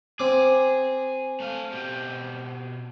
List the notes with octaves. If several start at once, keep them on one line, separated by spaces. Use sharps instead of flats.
C4 G#4 D6
A3 F5
B2 G4